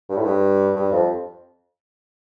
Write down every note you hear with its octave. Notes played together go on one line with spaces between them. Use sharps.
G2
A2
G2
G2
F2